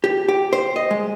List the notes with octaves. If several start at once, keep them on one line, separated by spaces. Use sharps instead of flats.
G4
G4
C5
D#5
G#3